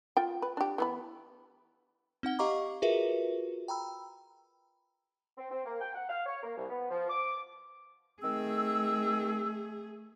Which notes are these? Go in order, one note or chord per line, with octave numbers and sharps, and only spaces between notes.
F4 G5
B4
D4 G4
E3 B3 B5
C4 D#4 F#5 G7
G4 D#5 F5 A#5 C#6 D6
F4 F#4 G#4 A#4 B4 E5
G5 A#5 B5 E6
C4
C4
A#3
G5
F#5
F5
C#5
A#3
C2
B3
F3
D6
D#3 A3 C4 G#4 E6